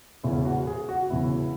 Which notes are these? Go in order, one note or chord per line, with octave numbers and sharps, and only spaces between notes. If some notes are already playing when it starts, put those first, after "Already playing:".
E1 E2 C#3 E4
F#4
G#4
F#4
F#4
E1 E2 C#3 E4